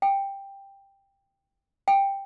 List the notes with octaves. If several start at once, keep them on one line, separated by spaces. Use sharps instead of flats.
G5
G5